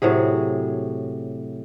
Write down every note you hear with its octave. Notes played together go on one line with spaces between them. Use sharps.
A2 C3 F#3 G#4